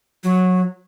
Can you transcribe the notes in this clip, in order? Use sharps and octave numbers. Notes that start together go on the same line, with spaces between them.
F#3